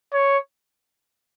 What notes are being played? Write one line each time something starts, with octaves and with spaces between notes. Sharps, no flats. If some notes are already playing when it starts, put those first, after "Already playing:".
C#5